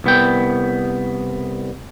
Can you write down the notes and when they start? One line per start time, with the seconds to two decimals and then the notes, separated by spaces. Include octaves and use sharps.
0.04 C2 B3 G5